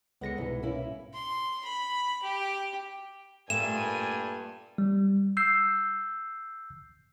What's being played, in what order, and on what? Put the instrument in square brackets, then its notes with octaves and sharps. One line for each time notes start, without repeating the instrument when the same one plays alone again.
[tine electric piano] C#2 A#6 C#7 [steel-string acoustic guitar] D3 G#3 B3
[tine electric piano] C2 G#2 B2 [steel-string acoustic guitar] E3
[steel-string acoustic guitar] A#3 C#4 E4
[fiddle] C6
B5
G4
[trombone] G2 [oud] A#2 A3 [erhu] G#5 [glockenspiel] E7
[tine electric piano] G3
E6 G6 C7